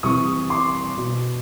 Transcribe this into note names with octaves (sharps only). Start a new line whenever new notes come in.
C3 E3 C#6 D#6
C6 D6
B2